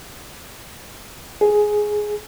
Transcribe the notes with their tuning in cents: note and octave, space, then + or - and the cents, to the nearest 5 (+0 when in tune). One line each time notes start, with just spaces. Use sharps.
G#4 +5